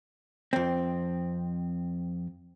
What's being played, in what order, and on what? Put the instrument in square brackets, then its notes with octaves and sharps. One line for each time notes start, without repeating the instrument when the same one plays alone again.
[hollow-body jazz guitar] F2 C4